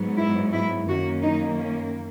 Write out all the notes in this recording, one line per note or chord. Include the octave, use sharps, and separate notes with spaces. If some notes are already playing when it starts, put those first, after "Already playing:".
Already playing: G#2 F#3 B3
E4
E4
F#2 D#3 A#3 C#4 F#4
D#4
C#4